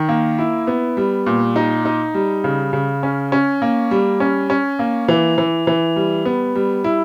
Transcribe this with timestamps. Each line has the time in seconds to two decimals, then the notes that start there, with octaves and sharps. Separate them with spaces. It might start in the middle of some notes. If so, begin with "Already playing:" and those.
Already playing: D#3
0.09 A#3
0.38 E4
0.67 B3
0.97 G3
1.26 A#2
1.56 D#4
1.85 D#4
2.14 G3
2.44 C#3
2.73 C#3
3.03 C#4
3.32 C#4
3.62 A#3
3.91 G3
4.20 C#4
4.50 C#4
4.79 A#3
5.08 E3
5.38 E3
5.67 E3
5.96 G3
6.25 B3
6.55 G3
6.84 E4